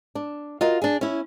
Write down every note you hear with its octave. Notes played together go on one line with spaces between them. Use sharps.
D4
F4 F#4 A#4 D#5 F5
D4 G#4
C#4 E4